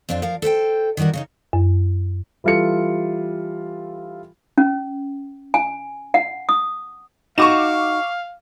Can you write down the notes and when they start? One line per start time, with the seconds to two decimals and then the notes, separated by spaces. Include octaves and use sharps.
0.09 F2 C4 D4 F4
0.22 F3 A#4 F5
0.42 A4 C5 F#5 G5
0.97 D#3 E3 G3 F#4 A#4
1.13 C#3 C#4 D#4
1.53 F#2
2.44 E3 G3 F4 A4 C#7
4.58 C#4
5.54 G#5
6.14 F#5
6.49 D#6
7.38 D#4 F#4 F5 C#6 D6 E7